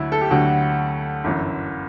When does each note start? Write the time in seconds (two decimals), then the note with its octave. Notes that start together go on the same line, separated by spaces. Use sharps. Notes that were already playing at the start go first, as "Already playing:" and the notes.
Already playing: D2 D3 F#3 E4
0.12 A4
0.21 G4
0.30 D2 D3 F#3 F#4
1.24 G1 F#2 E3